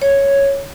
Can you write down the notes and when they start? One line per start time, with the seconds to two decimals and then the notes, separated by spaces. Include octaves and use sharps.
0.02 C#5